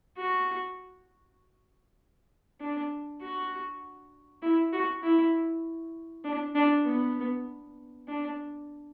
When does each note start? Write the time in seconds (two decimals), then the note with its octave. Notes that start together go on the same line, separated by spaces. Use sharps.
0.17 F#4
2.60 D4
3.21 F#4
4.42 E4
4.73 F#4
5.03 E4
6.24 D4
6.55 D4
6.85 B3
8.08 D4